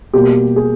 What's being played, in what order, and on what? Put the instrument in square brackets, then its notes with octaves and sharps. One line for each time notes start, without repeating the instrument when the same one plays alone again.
[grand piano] B2 G3 A#3 G4
G#4